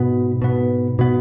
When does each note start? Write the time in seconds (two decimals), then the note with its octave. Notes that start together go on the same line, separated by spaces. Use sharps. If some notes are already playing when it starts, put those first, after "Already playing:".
Already playing: G#2 B2 B3
0.42 B2 B3
0.99 B2 B3